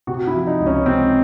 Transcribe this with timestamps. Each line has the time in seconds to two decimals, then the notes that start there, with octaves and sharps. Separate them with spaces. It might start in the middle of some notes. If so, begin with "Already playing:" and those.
0.07 C3 F#4
0.27 E4
0.33 F3
0.47 D#4
0.60 C#2
0.66 C#4
0.86 C3 C4